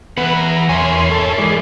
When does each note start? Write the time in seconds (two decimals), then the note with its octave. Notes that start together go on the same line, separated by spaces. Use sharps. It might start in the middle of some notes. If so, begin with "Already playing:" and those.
0.17 E3 B3 B4 F#5
0.37 A#5
0.69 E2 A#4 C#5 E5 G#5 C6
1.11 A4 C#5
1.38 E3 G#3 D5